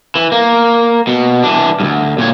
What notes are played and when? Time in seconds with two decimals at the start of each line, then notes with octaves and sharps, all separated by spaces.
0.16 E3
0.32 A#3
1.07 B2
1.44 E3 D4
1.80 D2 G2
2.18 A#2 C#5